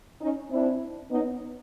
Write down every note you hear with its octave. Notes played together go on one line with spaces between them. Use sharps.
C#4 D#4
C4 D4 E4
B3 C#4 D#4